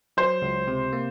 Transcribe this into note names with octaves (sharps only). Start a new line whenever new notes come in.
F#3 C5
C#2
C3
A#3